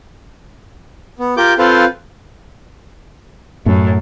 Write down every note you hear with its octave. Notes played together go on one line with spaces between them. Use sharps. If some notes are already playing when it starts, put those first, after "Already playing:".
B3
F4 G4 A#4 D6 G6
C4 F4 A4 B4 C5 F5
F#2 A2